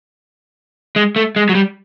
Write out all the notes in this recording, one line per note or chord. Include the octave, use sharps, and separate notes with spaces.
G#3
A3
G#3
F#3
G3